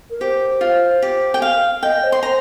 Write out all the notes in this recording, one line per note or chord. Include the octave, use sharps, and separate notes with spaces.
A#4
G4 C5
F4
G4
G5
F5
D#5 G5
D#5
C5
C6
C5 A#5